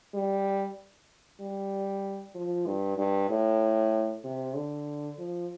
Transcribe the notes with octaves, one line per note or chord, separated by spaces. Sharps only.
G3
G3
F3
G2
G2
A2
C3
D3
F3